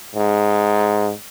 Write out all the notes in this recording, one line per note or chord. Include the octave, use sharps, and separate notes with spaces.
G#2